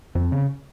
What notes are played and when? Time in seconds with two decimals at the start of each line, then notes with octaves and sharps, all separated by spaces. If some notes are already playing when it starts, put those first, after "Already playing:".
0.15 F2 C4
0.32 C#3